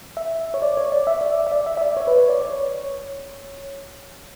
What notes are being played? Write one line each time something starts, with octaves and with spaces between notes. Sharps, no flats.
E5
C#5
D5
C#5
D5
E5
D5
E5
D5
E5
E5
D5
C#5
B4
C#5
D5
C#5